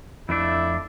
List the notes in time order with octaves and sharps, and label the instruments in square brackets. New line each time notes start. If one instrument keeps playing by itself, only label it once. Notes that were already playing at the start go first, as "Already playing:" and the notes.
[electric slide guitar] F2 A3 D4 [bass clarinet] E4